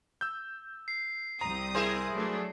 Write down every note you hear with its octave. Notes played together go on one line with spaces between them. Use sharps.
E6 G6
C7
C2 C4 A#5 D#6
E4 G#4 A#4 C5
F#3 A3 D4